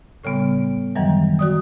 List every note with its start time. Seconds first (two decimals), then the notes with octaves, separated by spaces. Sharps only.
0.24 A2 C#3 G3 B3
0.96 F#2 D#3 E3 F#3 G3
1.39 F#4 D5 D#6